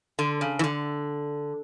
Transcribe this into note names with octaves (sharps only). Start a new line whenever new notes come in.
D3
C#3
E3
D3